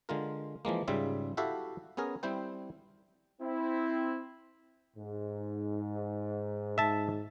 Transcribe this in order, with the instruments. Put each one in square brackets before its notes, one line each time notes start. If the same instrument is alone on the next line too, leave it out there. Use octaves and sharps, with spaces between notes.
[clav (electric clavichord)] D3 G#3 F4 A#4
E3 F3 G#3 A#3
G#2 C#3 G3 F4 E5
E4 F#4 G4 A4 E5 F5
B3 C#4 G#4 A#4
G3 C4 E4 C5 G5
[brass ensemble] C4 E4
[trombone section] G#2
[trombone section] G#2 [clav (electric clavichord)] E5 A5